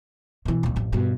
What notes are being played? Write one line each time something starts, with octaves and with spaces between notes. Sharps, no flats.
B2 E3
D1 A#1
A1 F2
G2 B2